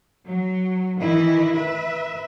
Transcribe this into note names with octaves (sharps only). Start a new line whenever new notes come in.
F#3
D#3 E3 E4 D#5
B4 E5